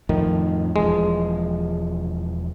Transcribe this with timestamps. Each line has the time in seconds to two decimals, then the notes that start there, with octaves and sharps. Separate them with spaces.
0.09 F2 A2 D#3 F3
0.76 E1 E2 F3 G#3